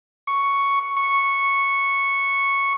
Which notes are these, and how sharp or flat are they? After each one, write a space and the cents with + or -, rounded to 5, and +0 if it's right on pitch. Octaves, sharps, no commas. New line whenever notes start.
C#6 +5
C#6 -5